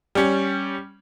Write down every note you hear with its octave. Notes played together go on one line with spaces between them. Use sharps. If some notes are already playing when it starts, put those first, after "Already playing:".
G3 C#4